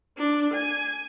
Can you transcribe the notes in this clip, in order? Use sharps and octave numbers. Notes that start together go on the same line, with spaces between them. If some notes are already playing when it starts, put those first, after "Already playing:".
D4
G#5